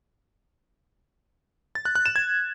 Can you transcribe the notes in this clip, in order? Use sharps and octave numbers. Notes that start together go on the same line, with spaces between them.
A6
F#6
F#6
E7
G#6